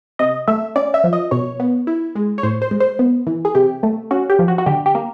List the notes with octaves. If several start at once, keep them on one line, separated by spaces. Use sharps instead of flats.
C3 D#5
A3 E5
C#4 D5
E5
F3
D#5
B2 C#5
B3
E4
G#3
C#5
A2 C5
C5
G#3
C5
B3
E3
G#4
C3 G4
A3
C#4 F#4
G4
F3
F#4
F#4
D3 G4
G4
A#3